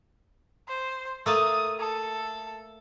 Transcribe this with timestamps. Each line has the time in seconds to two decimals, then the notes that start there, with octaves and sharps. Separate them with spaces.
0.68 C5
1.26 A3 A#3 A5 D#6
1.79 A4